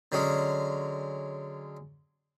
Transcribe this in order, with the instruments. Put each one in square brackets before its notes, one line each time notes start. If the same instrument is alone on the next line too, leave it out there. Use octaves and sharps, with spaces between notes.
[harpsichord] D3 F#3 G#3 C#4